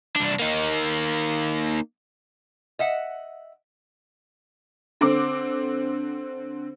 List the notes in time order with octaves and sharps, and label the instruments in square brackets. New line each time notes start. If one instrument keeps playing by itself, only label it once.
[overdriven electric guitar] C2 D4
A#3 D#4
[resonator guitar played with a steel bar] D#5 E5 F#5
[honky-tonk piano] D3 C4 D6